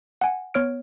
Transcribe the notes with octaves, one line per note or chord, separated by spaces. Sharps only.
F#5 G#5
B3 C#5 F6 D7